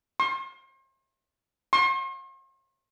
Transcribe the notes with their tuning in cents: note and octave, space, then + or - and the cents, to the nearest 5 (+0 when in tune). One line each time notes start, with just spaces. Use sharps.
C6 +40
C6 +45